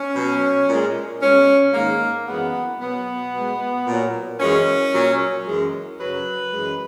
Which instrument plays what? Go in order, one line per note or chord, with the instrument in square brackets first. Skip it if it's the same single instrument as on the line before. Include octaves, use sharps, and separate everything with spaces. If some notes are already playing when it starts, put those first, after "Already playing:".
Already playing: [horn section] C#4
B2 F#3
A#2 G#3
B2 G#3 C#4
G#2 D#3 G#3 A#3
F#2 E3 G#3 B3
B2 F#3 B3
B2 G#3
A#2 F#3
F#2 E3 G#3 C#4
A#2 F#3
F#2 E3 G#3
F#2 C#3 F#3 B4
F#2 E3 G#3